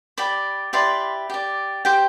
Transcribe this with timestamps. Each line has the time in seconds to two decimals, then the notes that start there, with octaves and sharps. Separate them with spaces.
0.18 G4 D5 B5
0.73 E4 G4 B4 D5 C6
1.30 G4 D5
1.85 G4 C5 G5